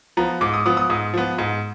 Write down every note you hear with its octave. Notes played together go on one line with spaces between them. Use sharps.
F3 B3 A#5
G#2 D6
D#6
F3 B3 D#6
D#6
G#2 D#6
F3 B3
G#2